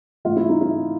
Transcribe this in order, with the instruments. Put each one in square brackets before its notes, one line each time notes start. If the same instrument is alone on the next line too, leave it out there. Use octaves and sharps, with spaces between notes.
[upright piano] A1 G#2 E3 A3 F4
E4
D#4
E4